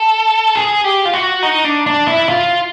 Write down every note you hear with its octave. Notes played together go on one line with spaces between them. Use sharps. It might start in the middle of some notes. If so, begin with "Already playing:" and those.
Already playing: A4
G#4
G4
F4
F#4
D#4
D4
D4
E4
F4